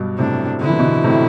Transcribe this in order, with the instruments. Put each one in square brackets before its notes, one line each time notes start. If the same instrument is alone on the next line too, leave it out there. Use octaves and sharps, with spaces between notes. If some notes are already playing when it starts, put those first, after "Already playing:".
Already playing: [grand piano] G2 B2
[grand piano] A2 C3 [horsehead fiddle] D4
[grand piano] D3 [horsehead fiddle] E4
[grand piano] E3
B2 D3
A2 C3